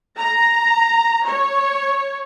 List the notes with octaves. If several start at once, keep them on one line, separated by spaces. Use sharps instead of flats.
A#5
C#5